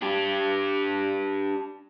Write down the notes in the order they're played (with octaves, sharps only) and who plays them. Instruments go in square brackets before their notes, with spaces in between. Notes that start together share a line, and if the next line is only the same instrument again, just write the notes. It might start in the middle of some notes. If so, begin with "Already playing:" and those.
[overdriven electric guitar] D4 G4